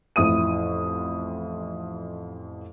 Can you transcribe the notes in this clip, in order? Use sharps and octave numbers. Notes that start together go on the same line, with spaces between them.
A1 F2 E4 D#6 D#7